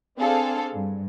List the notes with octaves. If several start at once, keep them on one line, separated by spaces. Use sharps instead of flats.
C4 D4 G#4 A4 F5
G2